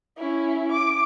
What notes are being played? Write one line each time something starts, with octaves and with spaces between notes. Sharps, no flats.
C#4 E4
D6